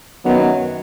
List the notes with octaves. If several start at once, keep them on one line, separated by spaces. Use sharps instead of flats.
F#2 D#3 F#3 B3